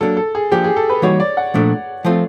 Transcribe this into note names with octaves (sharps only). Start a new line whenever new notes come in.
F#3 A#3 D4 A4
A4
G#4
F3 A#3 D4 G4
G#4
A4
B4
E3 G3 A#3 D#4 F#4 C#5
D5
F#5
A#2 F3 A3 D4
F3 A3 C4 F4